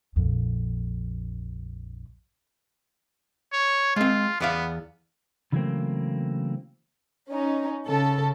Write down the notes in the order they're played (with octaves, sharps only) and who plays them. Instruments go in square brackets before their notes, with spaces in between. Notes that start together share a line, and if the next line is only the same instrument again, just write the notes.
[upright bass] A#1 F2
[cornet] C#5
[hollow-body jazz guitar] G#3 C4 [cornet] F4
[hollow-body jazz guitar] E2 D5 F5 [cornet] B3
[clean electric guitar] C#3 E3 F#3 A3 A#3 C4
[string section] C#4 D#4
C#3 A4